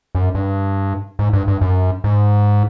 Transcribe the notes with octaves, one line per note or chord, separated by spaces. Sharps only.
F#2
G2
G#2
G2
G2
F#2
G#2